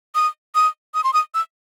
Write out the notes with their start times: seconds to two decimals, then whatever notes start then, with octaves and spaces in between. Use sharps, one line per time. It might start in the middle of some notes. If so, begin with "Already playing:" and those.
0.15 D#6
0.55 D#6
0.94 D#6
1.04 C6
1.13 D#6
1.34 E6